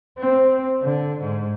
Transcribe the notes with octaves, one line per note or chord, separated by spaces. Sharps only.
C4
D3
G#2